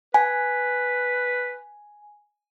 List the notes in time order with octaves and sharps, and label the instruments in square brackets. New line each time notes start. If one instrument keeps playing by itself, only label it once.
[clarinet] B4 [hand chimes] G#5